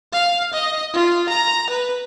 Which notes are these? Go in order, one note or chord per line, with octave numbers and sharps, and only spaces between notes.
F5
D#5
F4
A#5
B4